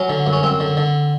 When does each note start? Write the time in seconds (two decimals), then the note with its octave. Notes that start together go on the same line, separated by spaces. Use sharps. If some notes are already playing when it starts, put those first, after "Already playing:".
Already playing: F#3 C#4
0.09 D3
0.27 F#2
0.33 C#4
0.43 F#2 C4
0.60 D3
0.77 D3